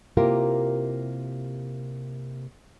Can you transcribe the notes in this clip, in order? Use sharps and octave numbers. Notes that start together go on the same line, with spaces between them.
C3 A#3 E4 F4 G4 A#4